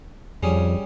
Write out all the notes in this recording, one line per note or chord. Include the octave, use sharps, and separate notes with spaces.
F2 G3 C#4 G#4